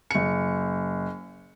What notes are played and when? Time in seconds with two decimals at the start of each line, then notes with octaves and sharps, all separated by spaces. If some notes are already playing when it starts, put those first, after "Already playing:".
0.11 F#1 C#7